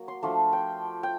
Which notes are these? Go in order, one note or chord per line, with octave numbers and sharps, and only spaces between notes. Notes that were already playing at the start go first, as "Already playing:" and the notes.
Already playing: F#3 A#3
C6
F3 A3 D4 F4
G5
G5